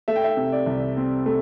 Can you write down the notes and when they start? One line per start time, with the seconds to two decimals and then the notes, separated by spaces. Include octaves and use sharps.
0.08 A3 E5
0.16 G5
0.24 E5
0.37 C3
0.52 D5
0.66 C2
0.97 C4
1.26 A3